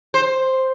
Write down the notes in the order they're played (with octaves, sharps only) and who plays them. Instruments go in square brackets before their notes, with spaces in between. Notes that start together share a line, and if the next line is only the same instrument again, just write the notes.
[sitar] C5